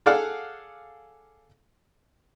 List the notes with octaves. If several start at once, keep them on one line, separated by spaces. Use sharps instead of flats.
G#4 A4 D5 F5 F#5